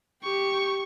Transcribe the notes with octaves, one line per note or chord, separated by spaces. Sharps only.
G4 C#6